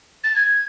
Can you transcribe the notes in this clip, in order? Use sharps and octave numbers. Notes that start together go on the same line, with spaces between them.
A6
G#6